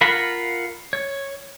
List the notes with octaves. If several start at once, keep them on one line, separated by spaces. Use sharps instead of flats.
F4 A#4 F5 F#5 B5
C#5